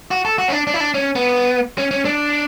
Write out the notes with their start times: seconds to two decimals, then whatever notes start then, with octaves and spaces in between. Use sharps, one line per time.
0.11 F#4
0.25 A4
0.38 F#4
0.48 C#4
0.53 D4
0.67 D4
0.74 E4
0.80 D4
0.94 C#4
1.16 B3
1.78 C#4
1.91 C#4
2.05 D4